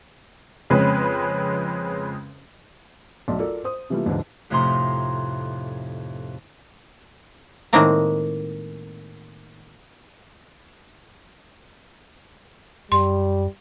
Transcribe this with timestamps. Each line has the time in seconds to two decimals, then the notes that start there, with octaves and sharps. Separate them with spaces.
0.70 F2 C#3 G#3 C4 C#4 B4
3.28 B1 A3 D5 A5 C6
3.39 F4 A4 A#4 D5
3.64 C5 D#6
3.90 C3 E3 G3 A3 A#3 F4
4.06 D#2 G#2 D3 E3 F3 D4
4.50 F2 A2 C3 D#4 A#5 C6
7.73 A2 D#3 G#3 A#3 C4 A#5
12.92 F#2 G3 C6